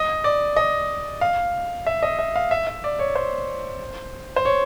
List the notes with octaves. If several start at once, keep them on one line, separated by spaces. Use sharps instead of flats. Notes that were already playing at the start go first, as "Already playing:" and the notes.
Already playing: D#5
D5
D#5
F5
E5
D#5
E5
F5
E5
E5
D5
C#5
C5
C5
C#5